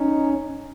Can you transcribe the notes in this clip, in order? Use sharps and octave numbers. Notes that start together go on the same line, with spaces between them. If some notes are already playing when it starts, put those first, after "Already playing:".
Already playing: C#4 D#4